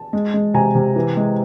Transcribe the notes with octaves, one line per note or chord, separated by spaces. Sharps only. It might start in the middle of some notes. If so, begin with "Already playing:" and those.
Already playing: A5
G#3
G#3
C3 G#5 A#5
C3
E3
G#3